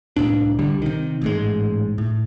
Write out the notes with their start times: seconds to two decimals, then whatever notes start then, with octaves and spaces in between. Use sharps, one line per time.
0.16 C2 A2 D4
0.59 C2 D3 G3
0.82 C3 D#3
1.22 A1 G#2 G#3
1.98 A2